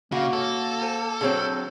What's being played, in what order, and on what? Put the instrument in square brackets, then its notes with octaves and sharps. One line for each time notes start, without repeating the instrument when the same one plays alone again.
[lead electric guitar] C#3 [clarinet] A#3 [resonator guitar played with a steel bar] F#4 [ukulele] D#5 F5
[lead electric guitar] A4 [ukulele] C#5
[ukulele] C5 G#5
[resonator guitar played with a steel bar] D3 F#3 C4 [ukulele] G#4 C#5 D5